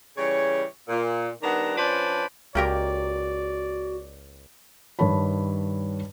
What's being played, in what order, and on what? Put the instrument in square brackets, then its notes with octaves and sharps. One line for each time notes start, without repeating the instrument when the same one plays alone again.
[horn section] C#3 E3 G3 C#5
A#2
D#3 G3 B3 D4 F#5 A#5
F3 C#4 D4 B4 C5 D5
[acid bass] C#2 [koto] A#3 G4 A#4 [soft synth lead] F#4 [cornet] D5
[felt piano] G2 D#3 C#5 A5 B5